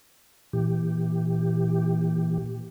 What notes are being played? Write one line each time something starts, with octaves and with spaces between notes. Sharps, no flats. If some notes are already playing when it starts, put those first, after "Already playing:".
A#2 E3 G4